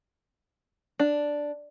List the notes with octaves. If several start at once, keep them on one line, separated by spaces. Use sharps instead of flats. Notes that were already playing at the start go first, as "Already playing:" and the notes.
D4